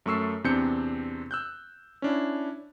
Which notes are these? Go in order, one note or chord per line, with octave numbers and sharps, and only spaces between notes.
F#2 A3 C#6 E6 C7
E2 C3 C4 D4 G6 C#7
E6 F#6 G6
C#4 D4 E4